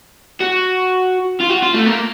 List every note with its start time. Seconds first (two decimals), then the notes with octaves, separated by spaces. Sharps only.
0.40 F#4
1.41 F4
1.50 F#4
1.63 F4
1.74 A3
1.86 A#3